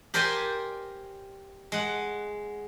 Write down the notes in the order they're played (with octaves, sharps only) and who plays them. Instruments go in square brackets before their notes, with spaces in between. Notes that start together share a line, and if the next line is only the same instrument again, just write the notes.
[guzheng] G4 A#4 C5 D5 G5 G#5
G#3 F#5